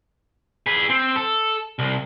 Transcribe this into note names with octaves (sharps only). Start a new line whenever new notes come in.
G#4 B4
C4
A4
C2